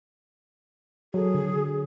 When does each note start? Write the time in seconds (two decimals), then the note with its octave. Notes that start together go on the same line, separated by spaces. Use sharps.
1.14 F#3 G#4 A4
1.34 D3